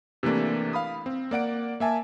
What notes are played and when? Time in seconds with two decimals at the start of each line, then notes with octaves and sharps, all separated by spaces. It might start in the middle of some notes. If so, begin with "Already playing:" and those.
0.23 C3 E3 A3 A#3 D4
0.73 F5 B5 D#6
1.06 C4
1.31 A#3 D5 F#5 D7
1.80 A#3 E5 G#5 A5